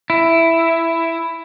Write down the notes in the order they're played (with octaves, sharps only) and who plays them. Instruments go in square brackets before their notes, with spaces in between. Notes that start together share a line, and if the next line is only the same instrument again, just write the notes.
[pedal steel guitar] E4